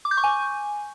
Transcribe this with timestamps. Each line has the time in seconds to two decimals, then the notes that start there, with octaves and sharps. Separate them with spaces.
0.05 D6
0.11 G6
0.17 C#6
0.24 G#5